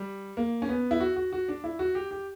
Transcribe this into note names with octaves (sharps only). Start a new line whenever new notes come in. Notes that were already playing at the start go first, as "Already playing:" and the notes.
Already playing: G3
A#3
C#4
B3
E4
F#4
F#4
F#4
D4
E4
F#4
G4
G4